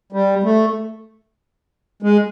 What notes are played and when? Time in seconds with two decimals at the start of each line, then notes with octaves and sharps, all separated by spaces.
0.12 G3
0.43 A3
2.02 G#3